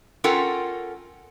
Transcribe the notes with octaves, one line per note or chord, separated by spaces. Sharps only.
C#4 F4 A4 A#4 F#5 G5